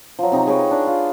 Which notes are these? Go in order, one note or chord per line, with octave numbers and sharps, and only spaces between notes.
F3 F#3
C3 D#4 A#5
G#4 B4 C#5 G5
D4
F4